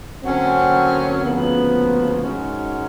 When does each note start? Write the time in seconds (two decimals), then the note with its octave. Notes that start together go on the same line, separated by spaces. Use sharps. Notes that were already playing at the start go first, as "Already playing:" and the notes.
0.23 D3 F#3 A#3 C4 C#4
1.23 D2 C#3 F3 A#3 B3
2.22 G#2 D#3 G#3 C#4 F#4